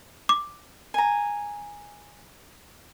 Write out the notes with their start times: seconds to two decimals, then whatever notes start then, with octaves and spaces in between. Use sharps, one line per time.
0.29 D6
0.94 G#5 A#5